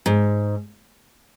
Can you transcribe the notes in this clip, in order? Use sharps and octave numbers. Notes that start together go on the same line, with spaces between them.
G#2